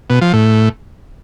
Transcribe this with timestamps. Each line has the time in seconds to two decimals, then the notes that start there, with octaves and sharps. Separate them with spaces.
0.10 B2
0.21 F3
0.33 A2